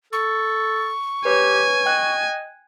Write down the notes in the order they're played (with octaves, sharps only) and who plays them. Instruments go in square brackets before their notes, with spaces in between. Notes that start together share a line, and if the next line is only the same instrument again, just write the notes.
[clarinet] A4 [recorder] C#6
[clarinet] G4 [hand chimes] B4 C#5 [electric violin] G#5
[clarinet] D#5 [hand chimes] G5 F#6